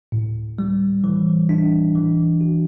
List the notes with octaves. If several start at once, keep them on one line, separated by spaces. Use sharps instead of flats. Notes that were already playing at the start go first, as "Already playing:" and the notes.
A2
G3
E3
D4
E3
F#4